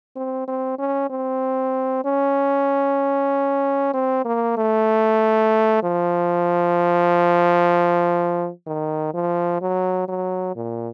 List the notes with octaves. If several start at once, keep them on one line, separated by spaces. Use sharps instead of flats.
C4
C4
C#4
C4
C#4
C4
A#3
A3
F3
D#3
F3
F#3
F#3
A#2